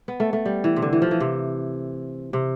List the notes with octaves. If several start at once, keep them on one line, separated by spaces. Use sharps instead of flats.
B3
A3
A3
G3
E3
C3
D3
E3
F3
E3
C3
C3